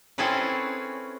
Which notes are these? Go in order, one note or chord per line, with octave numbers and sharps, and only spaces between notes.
C4 C#4 E4 G#4 A4 B4